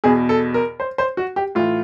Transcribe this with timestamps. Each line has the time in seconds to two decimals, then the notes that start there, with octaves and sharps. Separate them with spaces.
0.04 E2 B2 G#4
0.29 A4
0.54 A#4
0.80 C5
0.98 C5
1.17 F#4
1.36 G4
1.55 A2 E3 F4